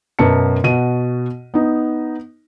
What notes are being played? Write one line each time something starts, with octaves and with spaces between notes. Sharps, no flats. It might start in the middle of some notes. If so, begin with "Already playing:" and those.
F#2 B2 B4 A5 C#7
B2 F#4 D#7
B3 D#4